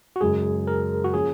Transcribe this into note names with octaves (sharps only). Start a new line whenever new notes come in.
F#4
F#2 C#3 G#3 G#4
A#4
F#4
F3 A#3 C#4 G#4